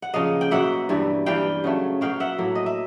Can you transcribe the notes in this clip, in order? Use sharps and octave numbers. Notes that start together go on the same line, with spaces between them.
F#5
C#3 F3 A#3 D#5 F5
G5
B2 F#3 A#3 E5 F#5
G2 E3 G3
G2 E3 G3 F5 G5
C#3 F#3 A3
B2 F#3 A#3 F5 G5
E5 F#5
A2 F#3 A#3
D#5
E5